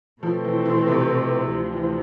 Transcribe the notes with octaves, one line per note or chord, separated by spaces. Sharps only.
B2 F3 A3 C4
E3
E3
C3
D2 C3 F3
E3